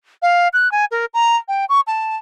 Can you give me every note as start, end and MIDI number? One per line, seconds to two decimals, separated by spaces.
0.22 0.48 77
0.53 0.71 90
0.72 0.85 80
0.91 1.06 70
1.14 1.36 82
1.48 1.65 79
1.69 1.81 85
1.87 2.16 81